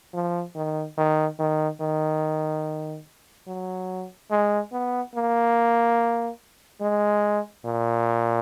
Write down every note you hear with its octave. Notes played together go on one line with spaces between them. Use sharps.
F3
D#3
D#3
D#3
D#3
F#3
G#3
B3
A#3
G#3
A#2